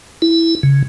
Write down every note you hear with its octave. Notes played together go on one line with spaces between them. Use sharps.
E4
C#3